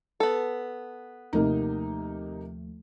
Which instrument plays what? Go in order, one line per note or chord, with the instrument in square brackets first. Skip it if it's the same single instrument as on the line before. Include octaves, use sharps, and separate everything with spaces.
[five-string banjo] B3 A4
[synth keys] D#2 F3 A3 [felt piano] C3 A#3 D#4